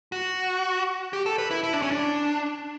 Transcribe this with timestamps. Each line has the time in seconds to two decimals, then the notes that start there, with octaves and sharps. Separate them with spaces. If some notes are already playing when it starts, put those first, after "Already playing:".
0.12 F#4
1.13 G4
1.26 A4
1.38 B4
1.51 E4
1.63 E4
1.73 D4
1.82 C#4
1.91 D4